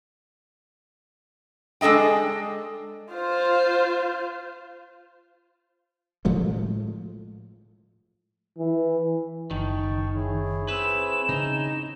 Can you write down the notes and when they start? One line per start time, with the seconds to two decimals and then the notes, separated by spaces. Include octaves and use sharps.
1.81 G#3 D4 A4 D#5 G5
3.13 F4 C5
6.25 A2 F3 G#3 A3
8.58 E3
9.51 F#1 D#3 E3 G5 A5 C#6
10.15 E4 G#4 C#5
10.68 C4 B4 E7
11.29 C#3 C4 C#4 D#4